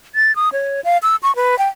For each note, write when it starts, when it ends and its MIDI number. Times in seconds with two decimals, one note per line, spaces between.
0.15 0.35 93
0.36 0.49 87
0.53 0.81 73
0.84 0.98 77
1.03 1.16 88
1.23 1.35 85
1.36 1.58 71
1.59 1.68 79